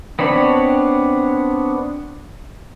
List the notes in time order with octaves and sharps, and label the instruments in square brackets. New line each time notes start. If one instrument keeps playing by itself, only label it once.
[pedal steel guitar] B3 C4 D4 C#5 B5